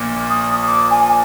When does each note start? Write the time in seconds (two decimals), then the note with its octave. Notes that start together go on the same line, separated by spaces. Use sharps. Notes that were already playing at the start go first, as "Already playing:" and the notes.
Already playing: A#1 A#2
0.29 D#6
0.67 D6
0.90 G#5